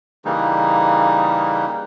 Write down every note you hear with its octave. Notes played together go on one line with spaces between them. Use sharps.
C#3 E3 G3 A#3 D#4